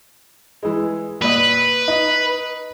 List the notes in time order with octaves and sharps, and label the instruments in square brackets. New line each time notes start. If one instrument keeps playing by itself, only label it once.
[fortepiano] E3 G#3
[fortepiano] A#2 D#5 [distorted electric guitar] B4
[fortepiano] D#4